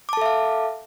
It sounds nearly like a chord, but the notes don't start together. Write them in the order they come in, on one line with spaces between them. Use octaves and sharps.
D6 A5 A4 E5 F5